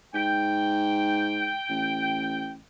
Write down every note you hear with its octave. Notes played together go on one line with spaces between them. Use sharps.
G#2 G5
A1